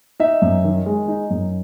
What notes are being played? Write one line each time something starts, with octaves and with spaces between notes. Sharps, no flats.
D#4 E5
F#2
D#3
G#3
D#4
F#2